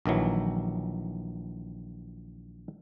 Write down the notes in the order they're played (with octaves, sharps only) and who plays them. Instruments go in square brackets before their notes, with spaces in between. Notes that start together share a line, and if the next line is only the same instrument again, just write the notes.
[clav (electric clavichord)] A#1 D#3 E3 F#3